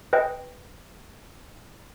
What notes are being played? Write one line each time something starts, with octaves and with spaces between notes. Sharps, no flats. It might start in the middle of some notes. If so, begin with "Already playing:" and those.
B4 D#5 G5